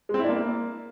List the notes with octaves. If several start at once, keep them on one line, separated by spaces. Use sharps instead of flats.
G#3
C4
E4
D4
A#3